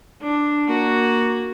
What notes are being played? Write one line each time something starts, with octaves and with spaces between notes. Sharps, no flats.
D4
A#3 F#4